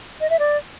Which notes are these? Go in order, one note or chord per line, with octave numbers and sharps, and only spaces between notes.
D#5
E5
D5